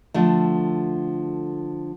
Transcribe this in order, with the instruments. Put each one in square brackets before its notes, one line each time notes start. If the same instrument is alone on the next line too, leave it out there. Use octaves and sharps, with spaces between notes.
[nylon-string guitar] D3 F3 A3